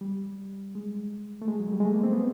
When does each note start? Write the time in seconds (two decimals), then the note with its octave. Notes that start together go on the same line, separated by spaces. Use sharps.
0.01 G3
0.75 G#3
1.42 A3
1.48 G#3
1.60 F#3
1.72 G3
1.80 G#3
1.85 A3
1.94 A#3
2.03 C4
2.13 B3